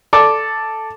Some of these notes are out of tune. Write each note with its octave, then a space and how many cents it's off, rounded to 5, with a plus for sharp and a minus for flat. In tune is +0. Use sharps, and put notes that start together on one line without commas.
A4 +0 D5 +0